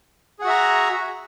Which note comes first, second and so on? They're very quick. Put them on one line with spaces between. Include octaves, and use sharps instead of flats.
G#4 F#5 F#4 E5 A#5